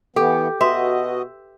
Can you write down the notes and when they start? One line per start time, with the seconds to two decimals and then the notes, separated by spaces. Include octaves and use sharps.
0.16 E3 B3 G4 A4
0.61 B2 F#4 B4 D#5 E5 C6